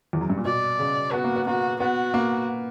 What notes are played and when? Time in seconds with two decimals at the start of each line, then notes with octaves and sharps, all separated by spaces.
0.13 E2
0.21 F#2
0.30 G2
0.38 A#2
0.45 B2 D5
0.79 C#3
1.13 B3 F#4
1.24 A#3
1.36 B3
1.47 A#3 F#4
1.80 B3 F#4
2.14 A#3